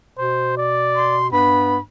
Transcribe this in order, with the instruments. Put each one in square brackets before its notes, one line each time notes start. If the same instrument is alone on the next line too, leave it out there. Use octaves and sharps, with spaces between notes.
[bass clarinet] B2 [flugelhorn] C5
[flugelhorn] D5
[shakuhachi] C6
[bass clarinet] G2 [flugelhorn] B3 [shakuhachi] B5